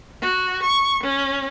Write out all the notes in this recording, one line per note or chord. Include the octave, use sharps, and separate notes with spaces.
F#4
C#6
C#4